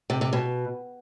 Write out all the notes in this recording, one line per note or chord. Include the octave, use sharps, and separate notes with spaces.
C3
C3
B2